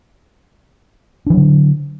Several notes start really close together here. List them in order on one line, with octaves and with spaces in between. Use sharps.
D4 E3 F#3 D3